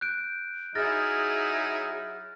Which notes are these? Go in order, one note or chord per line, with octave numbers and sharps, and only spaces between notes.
F#6 G6 D7
F#3 D#4 E4 G#4 F6 A6 A#6